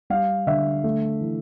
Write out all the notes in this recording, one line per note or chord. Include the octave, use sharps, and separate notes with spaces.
G3 F5
D3 E5
A3
E3